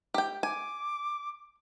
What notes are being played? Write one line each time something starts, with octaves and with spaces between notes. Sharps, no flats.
G4 G5
G#5 D6